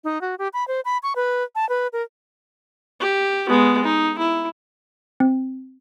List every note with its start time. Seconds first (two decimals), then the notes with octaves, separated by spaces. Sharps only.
0.04 D#4
0.21 F#4
0.39 G4
0.53 B5
0.68 C5
0.85 B5
1.03 C#6
1.16 B4
1.55 A5
1.69 B4
1.93 A#4
3.01 G4
3.49 G#3 B3
3.84 D#4
4.18 E4
5.20 C4